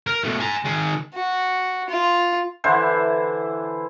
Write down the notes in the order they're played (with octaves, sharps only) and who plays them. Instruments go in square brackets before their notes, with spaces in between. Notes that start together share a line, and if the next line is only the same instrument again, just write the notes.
[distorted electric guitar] A#4
B2 A3
G#5 A#5
D#3 G#4
[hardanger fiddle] F#4
F4
[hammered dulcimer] D3 E3 E4 C5